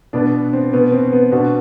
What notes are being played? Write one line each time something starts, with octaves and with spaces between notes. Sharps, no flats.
B2 B3 D4
C4
B2 B3
C4
B3
B2 D4 F#4